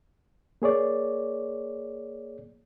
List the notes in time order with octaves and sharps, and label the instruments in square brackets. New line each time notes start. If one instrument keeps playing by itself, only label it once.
[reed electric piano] A#3 G#4 C#5 D5